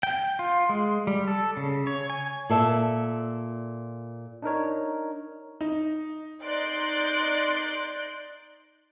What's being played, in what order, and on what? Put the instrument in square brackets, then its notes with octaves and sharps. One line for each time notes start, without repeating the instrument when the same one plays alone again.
[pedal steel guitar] G5
F4
G#3
G3
A4
C#3
C#5
G#5
[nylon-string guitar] A#2 A4 E5
[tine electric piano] D4 D#4 A#4 C#5
[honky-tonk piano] D#4
[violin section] D#4 D5 C6 F#6 G6 D7